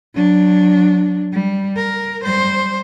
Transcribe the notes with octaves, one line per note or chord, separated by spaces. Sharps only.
F#3 D4
G3
A#4
G3 C5